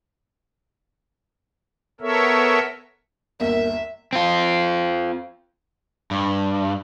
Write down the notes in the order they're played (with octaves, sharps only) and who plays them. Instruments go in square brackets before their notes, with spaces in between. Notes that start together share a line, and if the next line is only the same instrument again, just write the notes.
[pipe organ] B3 A4 A#4 C#5 E5
[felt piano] G1 D#2 [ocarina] A#4 [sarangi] E5
[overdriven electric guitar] C4 F4
[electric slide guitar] G2